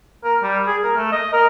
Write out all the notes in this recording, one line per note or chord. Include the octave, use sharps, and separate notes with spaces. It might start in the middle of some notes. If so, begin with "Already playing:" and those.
A#4
G3
G#4
A#4
A3
D#5
A#4